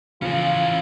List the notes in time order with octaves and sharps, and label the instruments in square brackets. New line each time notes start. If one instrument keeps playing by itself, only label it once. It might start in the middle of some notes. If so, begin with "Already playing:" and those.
[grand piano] C#3 F3 [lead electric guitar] E3 C#4 [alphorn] F4